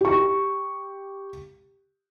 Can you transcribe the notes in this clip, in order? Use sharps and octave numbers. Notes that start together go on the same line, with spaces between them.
G4 C#6